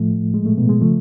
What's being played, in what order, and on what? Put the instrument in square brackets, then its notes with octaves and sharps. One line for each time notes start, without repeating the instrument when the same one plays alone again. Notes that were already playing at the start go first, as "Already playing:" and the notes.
Already playing: [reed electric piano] A2 F3 A3
G#3
A3
B2 B3
G#3
C#3 F3 A3